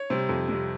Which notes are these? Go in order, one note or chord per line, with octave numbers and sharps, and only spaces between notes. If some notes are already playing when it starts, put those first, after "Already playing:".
Already playing: C#5
C3 G3 C5
F2
C3 G3